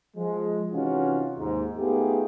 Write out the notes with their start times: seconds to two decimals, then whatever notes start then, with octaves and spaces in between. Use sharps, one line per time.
0.16 F3 G#3
0.72 C3 E3 C#4 D#4 F4 F#4
1.38 D#2 G#2
1.77 A3 B3 D#4 F4 G4 G#4